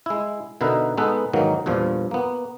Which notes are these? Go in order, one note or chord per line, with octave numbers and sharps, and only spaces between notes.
G#3 E4
B2 D3 D#4 E4 A#4 B4
G#3 B3 D#4 A4 B4
G#2 D#3 E3 F#3 A#3
E2 G2 A#2 F3
A#3 B3